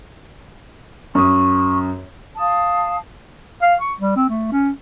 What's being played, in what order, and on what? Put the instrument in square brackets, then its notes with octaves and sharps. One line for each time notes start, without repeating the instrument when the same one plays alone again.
[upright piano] F#2 D#6 [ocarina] C#6
[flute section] F5 A5 D#6
[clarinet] F5
C#6
G3
C4
A3
C#4